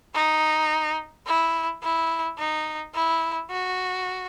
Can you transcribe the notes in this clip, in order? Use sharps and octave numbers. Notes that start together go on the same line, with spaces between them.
D#4
E4
E4
D#4
E4
F#4